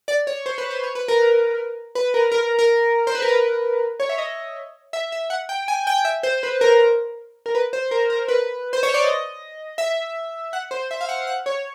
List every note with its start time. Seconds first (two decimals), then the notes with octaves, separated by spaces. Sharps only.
0.08 D5
0.27 C#5
0.46 C5
0.58 B4
0.70 C5
0.84 C#5
0.95 B4
1.08 A#4
1.95 B4
2.14 A#4
2.32 A#4
2.59 A#4
3.07 C5
3.15 B4
3.22 A#4
3.28 B4
4.00 C#5
4.09 E5
4.18 D#5
4.93 E5
5.12 E5
5.30 F#5
5.49 G5
5.68 G#5
5.87 G5
6.05 E5
6.23 C5
6.43 B4
6.61 A#4
7.46 A#4
7.55 B4
7.73 C5
7.91 A#4
8.10 A#4
8.28 B4
8.73 C5
8.83 C#5
8.94 D5
9.04 D#5
9.78 E5
10.53 F#5
10.71 C5
10.91 E5
11.01 F5
11.09 F#5
11.27 F#5
11.46 C#5